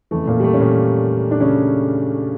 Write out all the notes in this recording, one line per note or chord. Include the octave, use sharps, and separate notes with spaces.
F2 C#3 E3 A3
A#2 A#3
G3
A3
C#4
A#2 A#3
D4
C#3 C#4